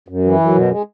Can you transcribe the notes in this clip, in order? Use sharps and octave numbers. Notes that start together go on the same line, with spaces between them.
F#2
E3
F#2
B2
G#3